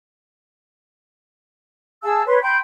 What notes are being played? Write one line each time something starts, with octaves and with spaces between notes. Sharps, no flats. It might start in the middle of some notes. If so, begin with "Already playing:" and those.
G#4 F5 A5 E6
B4 C#5 C6
G5 B5 C6 G6